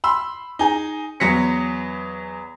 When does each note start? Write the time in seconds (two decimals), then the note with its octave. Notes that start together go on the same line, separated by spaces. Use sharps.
0.04 B5 C6 E6
0.59 D#4 G#4
1.20 E2 F#3 A#6 B6 C#7